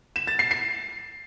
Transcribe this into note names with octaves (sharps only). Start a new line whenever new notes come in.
E7
A6
C7
C7